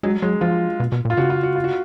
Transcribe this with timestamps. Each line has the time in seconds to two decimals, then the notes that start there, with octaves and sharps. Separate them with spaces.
0.03 F#3 G#3
0.22 F#3 G#3
0.41 F3 F4
0.80 B2
0.92 B2
1.05 A#2
1.10 F4
1.17 C#3 F#4
1.30 F4
1.43 F#4
1.56 F4
1.64 F#4